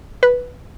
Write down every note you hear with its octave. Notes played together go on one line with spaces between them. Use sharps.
B4